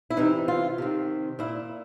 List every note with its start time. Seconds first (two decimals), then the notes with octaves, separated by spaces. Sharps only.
0.10 E4
0.17 C3 E3 D#4
0.48 F4
0.78 C3 D#3
1.39 A#2 E4